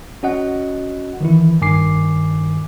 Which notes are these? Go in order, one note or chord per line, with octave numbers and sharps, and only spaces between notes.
C#4 F#4 D#5 F#5
D#3 E3 E4
G2 D#3 G#5 D6 C7